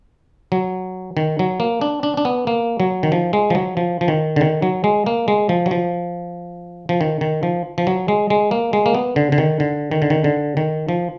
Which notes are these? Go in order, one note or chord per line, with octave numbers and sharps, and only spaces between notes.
F#3
D#3
F#3
A#3
D4
D4
D4
B3
A#3
F#3
D#3
F3
G#3
F3
F#3
F3
F3
D#3
D3
D#3
F#3
G#3
A#3
G#3
F3
F#3
F3
F3
D#3
D#3
F3
F3
F#3
G#3
G#3
A#3
G#3
A#3
B3
D3
D3
D#3
D3
D#3
D3
D#3
D3
D#3
F3